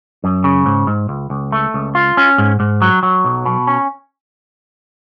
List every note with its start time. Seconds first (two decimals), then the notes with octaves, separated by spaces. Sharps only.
0.24 F#2
0.44 C#3
0.66 G#2
0.87 G#2
1.09 C#2
1.30 C#2
1.52 A3
1.74 C#2
1.95 F4
2.17 C#4
2.38 G#2
2.60 G#2
2.82 F#3
3.03 F#3
3.25 B1
3.46 B2
3.67 C#4